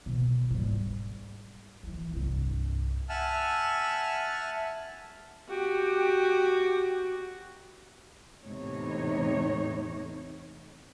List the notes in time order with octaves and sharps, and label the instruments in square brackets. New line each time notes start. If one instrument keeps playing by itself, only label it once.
[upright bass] B2
G#2 G3
D#3 E3
C2 G2
[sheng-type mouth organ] E5 F#5 G#5 A5 E6 F6
[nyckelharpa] F#4 [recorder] G4
[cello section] E2 A2 C3 D#4 C#5